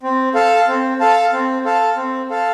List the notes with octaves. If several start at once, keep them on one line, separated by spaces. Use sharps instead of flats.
C4
A4 F5 A5
C4
A4 F5 A5
C4
A4 F5 A5
C4
A4 F5 A5